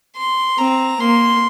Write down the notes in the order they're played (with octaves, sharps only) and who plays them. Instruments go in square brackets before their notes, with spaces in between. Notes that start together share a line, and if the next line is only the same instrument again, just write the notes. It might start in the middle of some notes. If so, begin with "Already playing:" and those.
[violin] C6
[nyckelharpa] C4 [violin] A#5
[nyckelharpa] A#3 [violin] C6